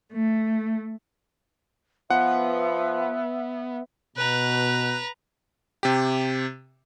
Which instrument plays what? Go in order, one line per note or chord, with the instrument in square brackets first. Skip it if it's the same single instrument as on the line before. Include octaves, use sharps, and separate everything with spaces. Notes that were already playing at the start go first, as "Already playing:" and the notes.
[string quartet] A3
[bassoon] F3 [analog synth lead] B3 [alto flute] E5 [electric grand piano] F#5
[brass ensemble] B2 [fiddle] B4 A#5 [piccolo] F#6
[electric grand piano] C3 G4